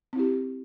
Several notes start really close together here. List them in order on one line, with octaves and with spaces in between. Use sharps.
C4 E4 G4